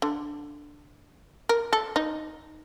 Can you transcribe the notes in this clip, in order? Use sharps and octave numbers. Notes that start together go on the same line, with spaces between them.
D3
A#4
A4
D#4